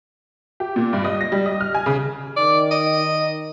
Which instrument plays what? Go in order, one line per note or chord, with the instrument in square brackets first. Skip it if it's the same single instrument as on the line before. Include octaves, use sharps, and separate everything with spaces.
[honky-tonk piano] G4
A#2
G2
D#5
A#6
G3
D#5
F6
G#5
C#3
[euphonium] D#3 [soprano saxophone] D5
[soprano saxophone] D#5